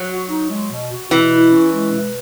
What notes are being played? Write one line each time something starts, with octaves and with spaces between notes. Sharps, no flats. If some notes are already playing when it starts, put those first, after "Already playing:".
Already playing: F#3
F#4
D#4
G#3
B2
F#4
B2 E3
E4
C#4
G#3
B2